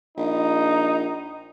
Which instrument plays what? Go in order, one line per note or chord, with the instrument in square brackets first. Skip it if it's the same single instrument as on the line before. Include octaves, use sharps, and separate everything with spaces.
[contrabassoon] A#1 [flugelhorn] D#4